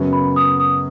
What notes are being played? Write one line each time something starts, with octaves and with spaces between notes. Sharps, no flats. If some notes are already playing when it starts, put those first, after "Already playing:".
Already playing: F#2 C#3 F#3 B3
B5
D#6
D#6